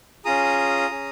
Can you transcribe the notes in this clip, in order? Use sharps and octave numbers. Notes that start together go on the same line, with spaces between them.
C#4 F4 G#4 A#5 D#6
C#4 G#4